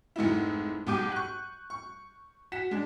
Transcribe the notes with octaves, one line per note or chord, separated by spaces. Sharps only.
F1 G#2 D#4 E4
B1 G#2 G4 D6 G6 D#7
C#6 F#6
C#6
F#4 B6 E7
G#3 D4